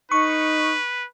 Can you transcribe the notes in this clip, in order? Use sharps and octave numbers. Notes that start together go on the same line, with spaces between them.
D#4 B4 C#6